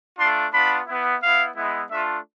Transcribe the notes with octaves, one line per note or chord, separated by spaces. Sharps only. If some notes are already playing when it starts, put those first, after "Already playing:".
A3 D4 F4 C6
B3 D4 F4 B5
B3 E4
B3 E4 F5
G#3 B3 E4
A3 D4 F4 E5